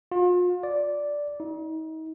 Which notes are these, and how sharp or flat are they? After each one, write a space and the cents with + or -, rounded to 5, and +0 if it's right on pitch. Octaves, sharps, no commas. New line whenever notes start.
F4 +40
D5 -5
D#4 +35